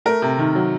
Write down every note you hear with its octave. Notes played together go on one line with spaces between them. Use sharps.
A3 A#4
C3
D#3
F#3